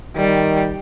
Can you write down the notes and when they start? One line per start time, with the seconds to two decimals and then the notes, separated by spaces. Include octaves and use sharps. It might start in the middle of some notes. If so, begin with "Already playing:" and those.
0.16 D#3 G3